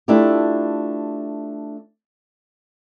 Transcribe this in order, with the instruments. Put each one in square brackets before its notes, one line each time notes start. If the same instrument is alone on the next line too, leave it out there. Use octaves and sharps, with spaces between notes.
[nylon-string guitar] A3 D4 E4 F4 G4